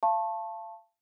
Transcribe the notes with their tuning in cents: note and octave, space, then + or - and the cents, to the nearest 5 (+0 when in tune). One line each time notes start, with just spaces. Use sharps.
F5 -35 A5 +0 C#6 -35